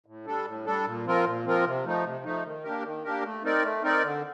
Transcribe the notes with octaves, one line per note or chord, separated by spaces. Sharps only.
A2
G3 D4 A4
A2
G3 D4 A4
A#2
F3 C4 F4 A#4
A#2
F3 C4 F4 A#4
C3
F3 A3 D#4
C3
F3 A3 D#4
D#3
A#3 D4 G4 A#4
D#3
A#3 D4 G4 A#4
A3
C4 D#4 A#4 D5
A3
C4 D#4 A#4 D5
D3